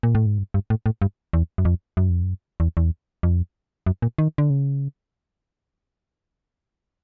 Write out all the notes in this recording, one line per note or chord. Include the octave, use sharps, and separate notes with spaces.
A#2
A2
G#2
G2
G2
A2
A2
G2
E2
F#2
F2
F#2
F2
F#2
E2
E2
F2
F#2
A#2
D#3
D3
C#3